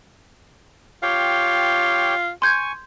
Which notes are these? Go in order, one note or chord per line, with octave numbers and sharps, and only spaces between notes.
F4 G4 C#5 G5
G#5 C6 C#6 G6 G#6